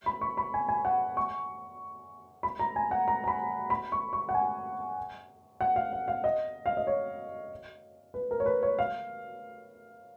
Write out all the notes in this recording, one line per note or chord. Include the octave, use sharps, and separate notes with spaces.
B5
C#6
B5
G#5
G#5
F#5
C#6
B5
A#5
G#5
F#5
A#5
A#5
B5
B5
C#6
C#6
F#5
G#5
F#5
F5
F5
F5
D#5
F5
D#5
C#5
B4
A#4
C#5
B4
C#5
F5